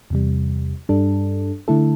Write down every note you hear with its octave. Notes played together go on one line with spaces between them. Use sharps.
E2 C3 G3
G2 G3 D4 A4
D3 A3 E4 A4